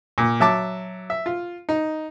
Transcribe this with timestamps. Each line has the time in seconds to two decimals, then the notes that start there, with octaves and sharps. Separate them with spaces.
0.18 A#2
0.40 F#3 E5 A5 D6
1.10 E5
1.26 F4
1.69 D#4